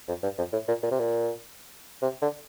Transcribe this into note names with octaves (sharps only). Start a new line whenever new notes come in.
F2
G2
F2
A2
A#2
A#2
C3
A#2
C3
D3